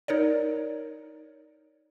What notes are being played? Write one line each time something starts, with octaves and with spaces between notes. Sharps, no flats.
D#4 A#4 C#5 D5